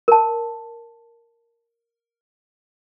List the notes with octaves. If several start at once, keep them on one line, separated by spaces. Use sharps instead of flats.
A#4 A5